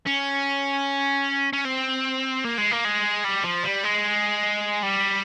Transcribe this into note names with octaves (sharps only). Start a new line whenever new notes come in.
C#4
C#4
C4
A#3
G#3
A#3
G#3
G3
F3
G3
G#3
G3